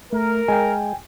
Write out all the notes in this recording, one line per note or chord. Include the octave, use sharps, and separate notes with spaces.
A3 A#4
G#3 G5 G#5